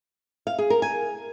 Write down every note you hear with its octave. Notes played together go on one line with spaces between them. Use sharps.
F5
G#4
A#4
G#5